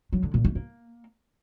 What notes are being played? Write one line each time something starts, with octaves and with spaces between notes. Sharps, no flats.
F#3
D3
A#2
A3
A#3